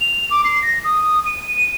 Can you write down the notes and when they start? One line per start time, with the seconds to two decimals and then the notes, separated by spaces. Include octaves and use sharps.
0.01 F7
0.30 D6
0.45 C7
0.62 A#6
0.84 D#6
1.26 D#7